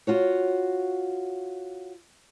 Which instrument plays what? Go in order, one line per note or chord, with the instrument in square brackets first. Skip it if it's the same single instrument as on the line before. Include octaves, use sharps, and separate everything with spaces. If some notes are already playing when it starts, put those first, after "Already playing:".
[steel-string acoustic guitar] F4 F#4 C#5